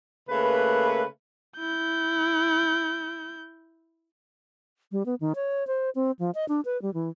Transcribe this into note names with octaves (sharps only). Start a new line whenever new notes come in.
C#3 A3 A#3 B4
E4 G6
G3
B3
D#3
C#5
C5
C4
F3
D#5
D4
B4
G3
E3